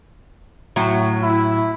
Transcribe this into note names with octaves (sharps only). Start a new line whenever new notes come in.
A2 F#3
E4